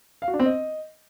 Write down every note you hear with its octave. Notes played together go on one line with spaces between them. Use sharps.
F5
F#4
D4
C4
D#5